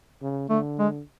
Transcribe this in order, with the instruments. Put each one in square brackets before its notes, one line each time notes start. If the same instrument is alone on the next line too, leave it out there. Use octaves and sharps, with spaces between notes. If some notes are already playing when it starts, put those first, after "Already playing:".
[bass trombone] C#3
[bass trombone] D3 [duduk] A3
[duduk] G#3